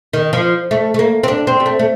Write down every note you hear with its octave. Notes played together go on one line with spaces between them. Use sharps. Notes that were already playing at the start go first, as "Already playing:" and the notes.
D#3
F3
A3
A3
A#3
C4
D4
C4
G3
A3
A3